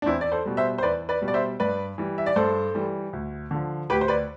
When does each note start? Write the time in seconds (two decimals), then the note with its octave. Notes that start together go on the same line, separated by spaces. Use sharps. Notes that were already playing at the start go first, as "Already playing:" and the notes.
0.02 D4
0.06 E2 C4 E4
0.21 D5
0.32 A4 C5
0.45 B2 G3
0.57 C5 E5
0.78 C5
0.82 E2 B4 D5
1.09 B4 D5
1.21 B2 G3
1.28 D5
1.34 C5 E5
1.60 G2 B4 D5
1.98 E3 G3
2.18 E5
2.26 D5
2.36 G2 A4 C5
2.75 E3 G3
3.13 D2
3.51 D3 F3
3.90 D2 G4 B4
4.01 C5
4.08 B4 D5